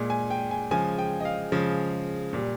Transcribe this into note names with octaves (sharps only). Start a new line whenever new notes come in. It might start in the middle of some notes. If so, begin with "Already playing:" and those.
Already playing: A#2 G#3
G#5
G5
G#5
C#3 F3 G#3 G#5
G5
D#5
F5
C#3 F3 G#3
A#2 G3